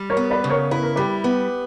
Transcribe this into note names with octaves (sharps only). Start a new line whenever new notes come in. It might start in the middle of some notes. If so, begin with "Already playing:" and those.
Already playing: G3
A#4 C#5
B3
B4 D5
C#3
A#4 C#5
E4 B4
A#4
G3 G4 B4
B3